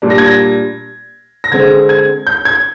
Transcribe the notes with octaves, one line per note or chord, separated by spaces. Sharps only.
A#2 G3 D4
A#6
G#6
A#6
A#6
D3 G#3 C4 G#6
G#6
G6
G#6